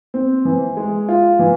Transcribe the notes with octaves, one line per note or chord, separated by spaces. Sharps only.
C4
E3
G#3
F4
E3